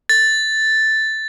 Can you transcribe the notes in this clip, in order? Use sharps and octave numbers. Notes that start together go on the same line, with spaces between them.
A6